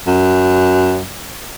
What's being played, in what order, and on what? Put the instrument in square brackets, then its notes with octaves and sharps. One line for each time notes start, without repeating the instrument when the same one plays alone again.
[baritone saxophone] F#2